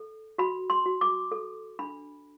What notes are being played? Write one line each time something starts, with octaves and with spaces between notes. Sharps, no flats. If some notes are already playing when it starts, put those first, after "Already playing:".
Already playing: A4
F#4 B5
C6
F#4
D6
A4
D4 B5